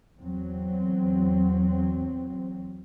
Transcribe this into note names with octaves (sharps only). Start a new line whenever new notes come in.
E2 F#3 C4